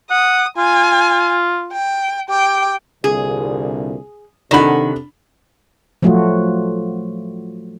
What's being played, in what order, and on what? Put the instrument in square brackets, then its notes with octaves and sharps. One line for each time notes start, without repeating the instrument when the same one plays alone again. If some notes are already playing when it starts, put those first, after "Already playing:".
[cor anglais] F#5 [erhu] D#6
[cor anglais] F4 [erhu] G#5
[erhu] G5
[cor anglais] G4 [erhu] G5
[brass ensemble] C2 A#2 D3 [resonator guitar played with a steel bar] G#4
[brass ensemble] C3 A4 [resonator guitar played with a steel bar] D#3 F#5 [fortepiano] D4 B5
[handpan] F3 F#3 A3 F4 F#4